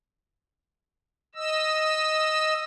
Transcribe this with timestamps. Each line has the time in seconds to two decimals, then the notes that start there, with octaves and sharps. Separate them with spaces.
1.35 D#5 E6